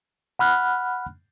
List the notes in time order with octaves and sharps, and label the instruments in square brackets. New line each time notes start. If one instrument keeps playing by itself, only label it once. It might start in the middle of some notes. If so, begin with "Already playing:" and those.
[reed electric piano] F#5 B5 F6 F#6